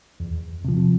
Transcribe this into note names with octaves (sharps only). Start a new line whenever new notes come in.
E2
C3 F3